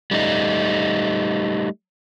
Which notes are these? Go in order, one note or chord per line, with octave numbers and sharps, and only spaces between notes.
G3 A3 D#4